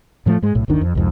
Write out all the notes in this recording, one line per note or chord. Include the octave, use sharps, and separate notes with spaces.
A2 F3 F#3 A3
G#2 G#3
B1 A2
G1 D#2 D#3 D4
F2
C2 F2 G#2